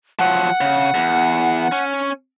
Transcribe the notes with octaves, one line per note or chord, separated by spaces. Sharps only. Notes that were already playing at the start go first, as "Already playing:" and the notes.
F3 F#3 F#5
C#3
E2
C#4